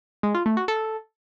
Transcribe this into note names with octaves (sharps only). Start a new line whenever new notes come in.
G#3
F4
A3
F#4
A4